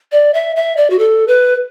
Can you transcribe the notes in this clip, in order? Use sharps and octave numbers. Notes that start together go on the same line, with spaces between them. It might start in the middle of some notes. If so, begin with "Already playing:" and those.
D5
E5
E5
D5
F#4
A4
B4